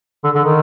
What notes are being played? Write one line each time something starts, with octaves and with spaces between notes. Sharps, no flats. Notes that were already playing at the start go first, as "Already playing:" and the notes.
D3
D3
D#3